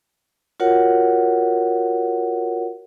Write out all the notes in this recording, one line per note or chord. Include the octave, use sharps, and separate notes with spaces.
F4 F#4 A#4 C#5 F#5